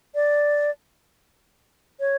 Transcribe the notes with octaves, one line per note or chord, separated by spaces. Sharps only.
D5
C#5